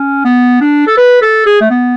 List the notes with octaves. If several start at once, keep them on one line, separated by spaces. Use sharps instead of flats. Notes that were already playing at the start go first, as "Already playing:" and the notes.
Already playing: C#4
B3
D4
A4
B4
A4
G#4
A3
B3